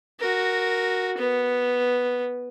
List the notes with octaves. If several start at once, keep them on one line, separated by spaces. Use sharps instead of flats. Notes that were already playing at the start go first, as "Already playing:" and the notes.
F#4 A#4
B3